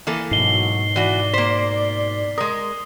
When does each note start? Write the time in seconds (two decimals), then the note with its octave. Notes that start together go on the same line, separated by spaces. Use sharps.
0.07 E3 A#3 A4
0.31 G#2 B2 F#3 C7 G7
0.96 E3 F#4 D5
1.33 A#3 C5 B6
2.38 G#3 A#4 D#6